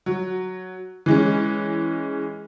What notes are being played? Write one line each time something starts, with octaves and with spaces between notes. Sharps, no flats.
F#3
E3 G#3 C#4